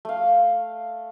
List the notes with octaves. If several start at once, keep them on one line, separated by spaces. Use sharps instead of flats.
A3 F5